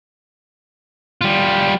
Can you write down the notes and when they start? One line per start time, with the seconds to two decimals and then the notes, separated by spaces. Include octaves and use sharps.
1.21 G3 F4